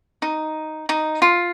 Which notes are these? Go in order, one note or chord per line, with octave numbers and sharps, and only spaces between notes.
D#4
D#4
F4